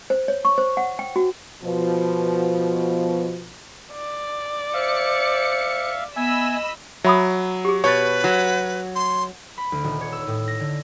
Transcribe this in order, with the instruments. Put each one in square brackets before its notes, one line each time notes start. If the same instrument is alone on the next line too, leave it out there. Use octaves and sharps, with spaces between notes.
[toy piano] C5
C#5
C#6
C5
F#5
G5
F#4
[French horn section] B2 F3
[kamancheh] D5
[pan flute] C5 [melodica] E5 F5 [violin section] C#7
[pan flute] B3 [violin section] D#5 B5 E6 [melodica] E5 G#5
[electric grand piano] F#3 [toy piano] E5 B5 D#6
[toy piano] G4 G#4
[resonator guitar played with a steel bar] B2 [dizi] B4 [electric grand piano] C#5 A6 [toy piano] C#6
[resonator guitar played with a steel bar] F#3
[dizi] C6
[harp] B5
D2
D#1
C#5
E6
A2
A#6
D3